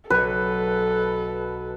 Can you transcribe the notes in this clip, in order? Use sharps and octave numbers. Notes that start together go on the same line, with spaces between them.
B1 A4 B4 C#5